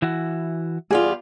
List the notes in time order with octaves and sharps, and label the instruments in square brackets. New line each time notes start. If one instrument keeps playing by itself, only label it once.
[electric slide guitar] E3 E4 F#4
[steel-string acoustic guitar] E2 G3 F4 [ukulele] G#4